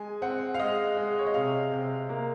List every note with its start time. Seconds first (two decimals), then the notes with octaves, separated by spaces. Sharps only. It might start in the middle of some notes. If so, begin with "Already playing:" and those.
Already playing: G#3 G#5
0.22 C4 F#5
0.54 F5
0.60 G#3 D#5
0.97 G#3
1.19 C#5
1.27 D#5
1.34 C3 F5
1.72 C3
2.09 A#3